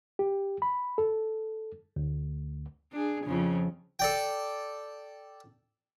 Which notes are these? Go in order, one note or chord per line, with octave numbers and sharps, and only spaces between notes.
G4
B5
A4
D2
D4 G#4
F2 C#3 F3
A4 D5 G5